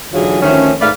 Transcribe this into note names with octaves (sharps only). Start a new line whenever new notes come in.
G#2 D3 E3 F#3 F4 G#4
D2 D#3 F3 A3 C#4
G#2 A3 B4 D5 F5